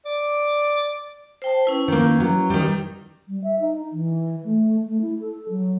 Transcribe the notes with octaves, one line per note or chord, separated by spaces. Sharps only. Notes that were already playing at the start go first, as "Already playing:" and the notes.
D5
C5 G5 A5
C#4 E4 B4
D#3 A#3
F#3
D#3 G3
G3
E5
D#4
E3
A3
A3
E4
A4
F#3